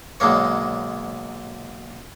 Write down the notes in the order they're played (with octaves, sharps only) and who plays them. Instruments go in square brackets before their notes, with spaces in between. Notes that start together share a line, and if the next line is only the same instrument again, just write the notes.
[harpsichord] B1 D3 G#3 A#3 C#5